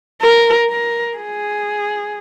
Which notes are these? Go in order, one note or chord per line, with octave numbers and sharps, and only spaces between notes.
A#4
A#4
G#4